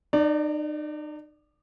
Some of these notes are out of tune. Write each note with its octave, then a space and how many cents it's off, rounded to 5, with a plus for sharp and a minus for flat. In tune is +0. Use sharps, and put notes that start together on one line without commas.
D#4 -40 D5 +0